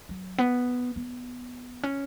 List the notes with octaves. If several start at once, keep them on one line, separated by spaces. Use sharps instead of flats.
F#3
B3
B3
C#4